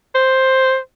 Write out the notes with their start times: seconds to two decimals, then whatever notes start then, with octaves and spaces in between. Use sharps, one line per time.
0.15 C5